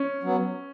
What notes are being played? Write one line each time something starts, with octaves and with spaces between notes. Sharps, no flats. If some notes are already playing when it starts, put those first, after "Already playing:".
Already playing: C#4
F#3 B3